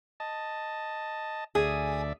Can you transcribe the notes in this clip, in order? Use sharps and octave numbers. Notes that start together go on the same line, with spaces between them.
D#5 A5
D2 G#4 D5 E5